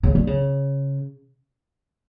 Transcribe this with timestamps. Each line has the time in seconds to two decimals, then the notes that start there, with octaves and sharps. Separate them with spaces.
0.03 C#3
0.15 D3
0.27 C#3